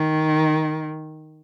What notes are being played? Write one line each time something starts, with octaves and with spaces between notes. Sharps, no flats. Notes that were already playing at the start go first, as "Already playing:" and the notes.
Already playing: D#3